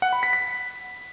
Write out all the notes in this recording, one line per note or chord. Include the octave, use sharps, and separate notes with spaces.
F#5
B5
B6
B6